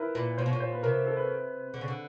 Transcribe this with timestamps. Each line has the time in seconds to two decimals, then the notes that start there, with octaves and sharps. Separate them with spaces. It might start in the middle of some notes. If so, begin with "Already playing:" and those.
Already playing: E4 A#4 B4
0.15 A#2 B4
0.38 A#2 C5
0.46 B2
0.49 A#2 C#5
0.60 C5
0.72 B4
0.83 C3 A#4
1.06 A4
1.17 B4
1.74 D3
1.81 C#3
1.88 D3